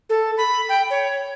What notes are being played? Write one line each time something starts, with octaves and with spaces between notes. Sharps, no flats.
A4
B5
G5
C#5